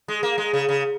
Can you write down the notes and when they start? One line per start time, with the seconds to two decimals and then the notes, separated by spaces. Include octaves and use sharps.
0.08 G#3
0.23 A#3
0.38 G#3
0.53 C#3
0.68 C#3